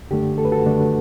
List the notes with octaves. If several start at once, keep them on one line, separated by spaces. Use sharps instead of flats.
F#2 D3 A3 D4 G4
A4
B4
F#4 A4
F#2 D3 A3 D4